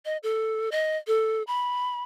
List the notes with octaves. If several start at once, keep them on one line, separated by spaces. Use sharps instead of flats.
D#5
A4
D#5
A4
B5